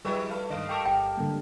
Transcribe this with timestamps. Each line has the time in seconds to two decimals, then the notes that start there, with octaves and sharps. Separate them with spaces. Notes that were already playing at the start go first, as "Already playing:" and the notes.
0.05 F3 G3 D#4 E4 G#4 B4 G5
0.30 A3 B4 F5
0.50 G2 D#3 G#3 D#5 F5
0.69 G4 A4 A#4 G5 C#6 E6
0.85 G1 G5
1.18 G#2 D3 G3 A#3